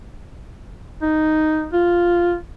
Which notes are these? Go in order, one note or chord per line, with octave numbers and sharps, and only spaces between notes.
D#4
F4